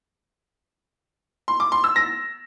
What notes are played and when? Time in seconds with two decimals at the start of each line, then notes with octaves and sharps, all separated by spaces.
1.48 C6
1.60 D6
1.72 C6
1.84 E6
1.96 A#6